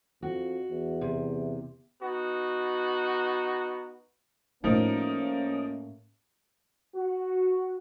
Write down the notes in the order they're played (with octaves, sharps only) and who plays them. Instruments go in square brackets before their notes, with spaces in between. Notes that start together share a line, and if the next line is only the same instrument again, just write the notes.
[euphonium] F2 [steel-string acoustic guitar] F#4
[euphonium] E2
[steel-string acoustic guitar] C3
[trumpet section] B3 D#4 F#4
[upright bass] A2 F4 [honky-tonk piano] F3 D#4 A#4 [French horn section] A3 A#3 C#4
[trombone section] F#4